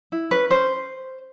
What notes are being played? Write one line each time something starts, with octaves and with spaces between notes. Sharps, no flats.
E4
C#4 B4
C#4 C5